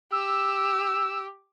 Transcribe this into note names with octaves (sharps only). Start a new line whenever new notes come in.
G4 E6